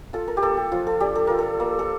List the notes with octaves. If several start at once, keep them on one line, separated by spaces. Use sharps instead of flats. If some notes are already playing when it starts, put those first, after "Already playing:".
F4 A4
A#4
G4
A#3 A4
G4
F3 F4
A4
D4 G4
A4
F4 A#4
A4
A#3
A4